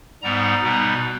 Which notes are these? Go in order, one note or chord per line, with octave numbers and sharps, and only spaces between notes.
G#2 G3 B3 D#4 A#5
B2 G3 B3 D#4